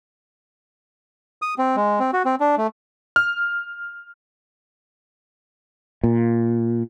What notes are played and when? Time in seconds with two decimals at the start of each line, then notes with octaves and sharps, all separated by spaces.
1.42 D#6
1.58 C4
1.76 G#3
2.00 C4
2.13 F#4
2.25 C4
2.40 D4
2.58 A3
3.16 F6
6.03 A#2